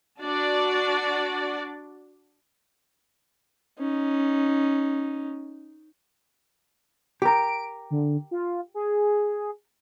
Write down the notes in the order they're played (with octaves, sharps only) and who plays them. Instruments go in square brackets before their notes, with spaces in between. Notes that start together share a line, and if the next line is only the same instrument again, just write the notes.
[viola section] D4 F#4 D5
[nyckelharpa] C#4 D#4
[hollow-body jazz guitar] G4 A#4 [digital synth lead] D7
[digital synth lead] D3
F4
G#4